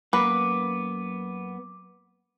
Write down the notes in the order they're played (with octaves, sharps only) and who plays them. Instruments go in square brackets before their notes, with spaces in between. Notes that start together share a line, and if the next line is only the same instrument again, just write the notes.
[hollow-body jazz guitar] F#2 A#3 B3 [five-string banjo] B4 [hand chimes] D6